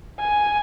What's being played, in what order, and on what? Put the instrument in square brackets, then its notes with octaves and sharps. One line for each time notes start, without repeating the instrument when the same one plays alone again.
[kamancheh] G#5